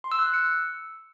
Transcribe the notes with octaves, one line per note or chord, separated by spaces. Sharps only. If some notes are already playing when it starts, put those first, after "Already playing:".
C6
E6
F#6
E6
C#7